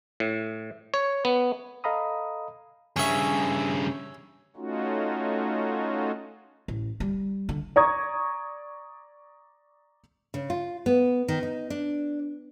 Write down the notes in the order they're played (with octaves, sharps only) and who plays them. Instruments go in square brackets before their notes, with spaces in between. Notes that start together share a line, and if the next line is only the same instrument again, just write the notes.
[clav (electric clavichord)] A2
C#5
B3
[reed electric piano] A4 D#5 F5 A#5 B5 D#6
[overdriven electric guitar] G2 C#3 [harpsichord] C#4 E5
[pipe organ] A3 C#4 D#4 F4 F#4
[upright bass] A1
G3
D3
[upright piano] D5 A#5 C#6 D#6 G#6
[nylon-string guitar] C#3
F4
B3
D#3
D#4
D4